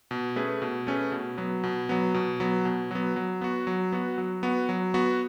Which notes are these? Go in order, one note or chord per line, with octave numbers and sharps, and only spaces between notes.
B2
A3 C#4 G#4 B4
B2
A3 C#4 G#4 B4
B2
F#3 B3
B2
F#3 B3
B2
F#3 B3
B2
F#3 B3
F#3
B3 F#4
F#3
B3 F#4
F#3
B3 F#4
F#3
B3 F#4